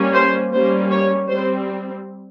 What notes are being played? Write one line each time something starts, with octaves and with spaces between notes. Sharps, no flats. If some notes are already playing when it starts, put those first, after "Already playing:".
Already playing: G3 A#3 C#4
C5
G3 A#3 C#4 C5
C#5
G3 C4 C5